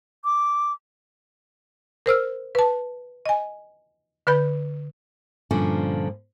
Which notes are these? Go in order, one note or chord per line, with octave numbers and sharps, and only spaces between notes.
D6
A#4 C5 E6 F6
B4 A5
D#5 G#5
D3 B4 B5 G6
G2 A#2 D3 F3 C#4